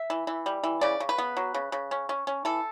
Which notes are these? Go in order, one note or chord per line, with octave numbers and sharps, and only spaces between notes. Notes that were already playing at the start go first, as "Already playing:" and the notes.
Already playing: E5
E3
E3
G3
E3
C#3 D5
C#3
B4
B3
F#3
C#3
C#3
C#4
C#4
C#4
E3 A4